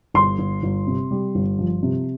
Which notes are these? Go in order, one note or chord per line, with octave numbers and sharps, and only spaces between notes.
G1 C6
G1
G1
C3
G3
G1
F3
C3